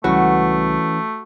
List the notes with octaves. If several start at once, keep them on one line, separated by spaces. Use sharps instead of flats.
C#2 E3 G3 A3 C#4 F#4 B4